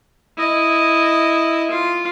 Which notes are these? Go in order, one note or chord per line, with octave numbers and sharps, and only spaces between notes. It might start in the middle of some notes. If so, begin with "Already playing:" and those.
E4 D#5
F4